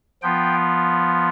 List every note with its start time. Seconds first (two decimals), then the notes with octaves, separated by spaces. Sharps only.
0.22 F3 B3 F4 G5